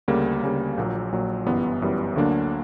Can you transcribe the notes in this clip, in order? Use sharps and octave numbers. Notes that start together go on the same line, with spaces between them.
D2 C#3 G3 A#3
D2 C#3 G3 A#3
A#1 A#2 F#3
A#1 A#2 F#3
G1 F#2 E3 G3 B3
G1 F#2 E3 G3 B3
D2 D3 F#3 A#3 D4